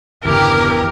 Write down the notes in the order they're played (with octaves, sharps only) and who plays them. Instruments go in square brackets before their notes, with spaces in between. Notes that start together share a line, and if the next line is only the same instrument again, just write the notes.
[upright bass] G1 C#3 [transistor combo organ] E2 [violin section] G4 D6 [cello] A#4